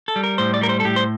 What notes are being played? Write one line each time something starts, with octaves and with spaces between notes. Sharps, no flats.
A4
G3
A#4
A2 C5
D5
G3 A#4
C5
A4
A2 G4
C5